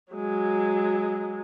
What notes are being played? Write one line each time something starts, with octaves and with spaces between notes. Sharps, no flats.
F#3 G#3